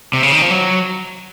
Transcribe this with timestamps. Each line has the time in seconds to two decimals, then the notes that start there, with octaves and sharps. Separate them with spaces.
0.13 C3
0.23 C#3
0.32 D#3
0.42 F3
0.51 F#3